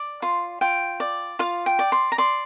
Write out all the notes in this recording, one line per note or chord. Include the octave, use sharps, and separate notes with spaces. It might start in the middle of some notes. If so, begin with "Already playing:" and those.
Already playing: D5
F4 C6
F4 G5
D5
F4 F5
G5
D5
C6
A#5
D5 C6